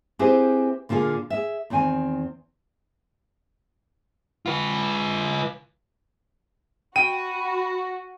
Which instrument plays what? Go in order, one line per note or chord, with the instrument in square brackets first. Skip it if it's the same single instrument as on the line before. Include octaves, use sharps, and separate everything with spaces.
[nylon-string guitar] C4 E4 G4 G#4 B4 C5
A#2 D3 A#3 F4 G#4
G#4 E5
E2 D#3 C4 G5 G#5
[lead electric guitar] F4 B4
[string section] F#4 [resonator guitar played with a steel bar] G5 [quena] B5 [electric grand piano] D#7